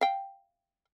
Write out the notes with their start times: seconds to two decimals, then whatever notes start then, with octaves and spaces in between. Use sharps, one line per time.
0.01 F5 G5